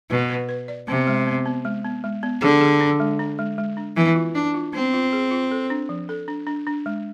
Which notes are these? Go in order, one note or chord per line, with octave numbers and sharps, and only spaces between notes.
B2 B4
B4
B4
D5
C3 B3
G#3
B3
B3
G#3
B3
G#3
B3
D3 G#4
G#4
D4
G#3
D4
G#3
G#3
D4
E3 B3
F4
D4 D5
F4
B3 C4
F4
G#4
F4
A4
D4
F3
A4
D4
D4
D4
G#3